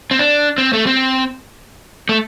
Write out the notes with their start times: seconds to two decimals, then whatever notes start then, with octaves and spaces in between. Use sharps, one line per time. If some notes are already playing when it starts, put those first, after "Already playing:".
0.11 C4
0.19 D4
0.58 C4
0.73 A3
0.87 C4
2.09 A3